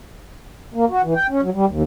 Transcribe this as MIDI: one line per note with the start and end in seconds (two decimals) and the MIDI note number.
0.74 0.85 58
0.90 1.02 66
1.03 1.14 52
1.15 1.27 79
1.30 1.41 61
1.42 1.50 54
1.54 1.65 55
1.69 1.83 39